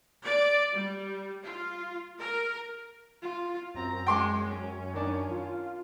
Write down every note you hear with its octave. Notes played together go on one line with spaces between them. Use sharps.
D5
G3
F4
A#4
F4
F#2 C4 A#5
G#3 G5 C6 D6
C#4
D#3 D4
F4